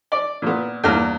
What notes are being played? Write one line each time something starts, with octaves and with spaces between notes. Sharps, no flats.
D5
A#2 B3
E2 G2 A#3 F6